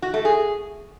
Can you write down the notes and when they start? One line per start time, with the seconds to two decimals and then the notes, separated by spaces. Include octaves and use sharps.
0.02 F#4
0.14 A3
0.25 G#4